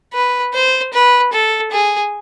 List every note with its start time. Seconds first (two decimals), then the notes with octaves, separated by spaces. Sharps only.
0.13 B4
0.54 C5
0.93 B4
1.32 A4
1.71 G#4